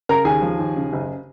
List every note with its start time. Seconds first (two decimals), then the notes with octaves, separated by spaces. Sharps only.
0.09 C#3 A#4 A#5
0.25 D#2 G#4 G#5
0.42 F3
0.59 D#2
0.77 C#3
0.93 F#1